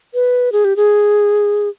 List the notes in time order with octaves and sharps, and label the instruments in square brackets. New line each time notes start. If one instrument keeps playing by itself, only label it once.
[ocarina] B4
G#4
G4
G#4